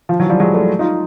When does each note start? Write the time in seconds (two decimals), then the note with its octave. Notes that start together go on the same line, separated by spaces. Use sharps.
0.09 F3
0.20 E3 F#3
0.30 F3 G3
0.40 F#3 G#3
0.54 G3 A3
0.79 D#4 F4